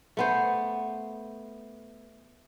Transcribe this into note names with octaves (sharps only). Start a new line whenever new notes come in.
A3 B3 C5